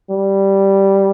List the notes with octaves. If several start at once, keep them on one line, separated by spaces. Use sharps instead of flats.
G3